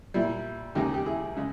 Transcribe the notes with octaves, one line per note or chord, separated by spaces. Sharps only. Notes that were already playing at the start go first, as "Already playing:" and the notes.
A#2 G3 E4
D#2 C#3 G#3 D#4 G4
G4
E4 G#4
C#3 G#3